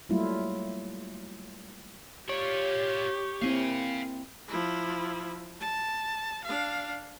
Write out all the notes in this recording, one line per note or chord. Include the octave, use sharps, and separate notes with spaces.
F#3 G3 A3 A#3 E4 F4
F4 G4 C#5 D5
A#3 C4 E4 F5 G#5
F3 E4
A5
D4 F5